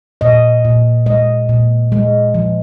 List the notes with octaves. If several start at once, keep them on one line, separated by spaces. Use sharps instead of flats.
A#2 D#5
A#2
G#3 D#5
A#2
G#3
F3